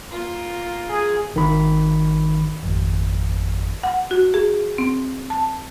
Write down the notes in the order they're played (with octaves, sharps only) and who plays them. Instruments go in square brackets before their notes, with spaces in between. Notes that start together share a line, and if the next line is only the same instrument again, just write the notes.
[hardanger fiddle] A#3 F4
[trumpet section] G#4
[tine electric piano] G#1 D#3 B5
G#1 F2
[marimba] F#5
F#4
G#4
C4
A5